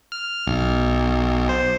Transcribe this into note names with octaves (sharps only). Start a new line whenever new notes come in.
F6
B1
C5